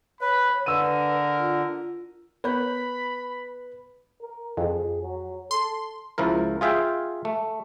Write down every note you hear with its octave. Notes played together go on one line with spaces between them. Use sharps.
B4 C#5 B5
D3 A#4 B4 E6 D#7
F4
B3 A#4 B4 C#5 B5 G6
A#4
F2 G#4
F#3
A4 C6
C#2 F3 E4 A#4
F4 G#4 E5 F5 G5
A3